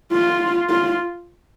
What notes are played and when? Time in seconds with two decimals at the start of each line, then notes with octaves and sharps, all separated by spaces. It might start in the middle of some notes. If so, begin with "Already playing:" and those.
0.13 F4
0.69 F4